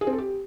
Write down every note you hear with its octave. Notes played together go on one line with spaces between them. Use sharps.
G#4
C4
A4
G4